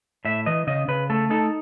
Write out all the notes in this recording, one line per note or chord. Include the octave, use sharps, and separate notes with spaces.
A2 E5
E3 D#5
C#3 D#5
C#3 B4
A3 A4
D#4 A4